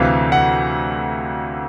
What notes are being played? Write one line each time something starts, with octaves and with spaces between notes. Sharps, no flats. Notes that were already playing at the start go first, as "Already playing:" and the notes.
Already playing: D2 C3 E3 F5
F#5